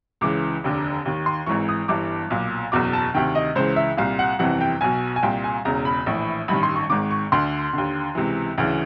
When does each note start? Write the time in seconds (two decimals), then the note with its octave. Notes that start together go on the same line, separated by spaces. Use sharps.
0.21 C#2 C#3 E3 D6
0.64 F1 D#2 D3
1.05 D#2 D#3
1.26 C6
1.46 G#1 G#2 E3 C#6
1.69 D#6
1.88 G1 G2 E3 D6
2.30 B1 A#2
2.72 F#1 E2 B2 D6
2.93 A5
3.14 D2 C3 D#3 G5
3.35 D#5
3.55 C#2 C#3 E3 C5
3.76 E5
3.97 C2 A#2 F5
4.19 F#5
4.39 G1 F2 C3 E3 F#5
4.61 G5
4.81 B1 B2 G#5
5.16 G#5
5.23 C2 A#2 G5
5.44 G#5
5.65 E1 E2 C#3 A#5
5.85 B5
6.06 A#1 A2 E3
6.48 A1 G2 D#3 B5
6.63 C6
6.76 C#6
6.90 G#1 G#2 D#3 D6
7.11 C#6
7.32 D2 D3 C6
7.73 D#2 D3
8.15 C#2 C3 E3
8.58 D2 C#3 E3